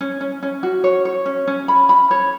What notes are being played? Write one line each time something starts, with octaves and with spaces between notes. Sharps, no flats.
C#4
C#4
C#4
F#4
C#5
C#5
C#4
C#4
B5
B5
C#5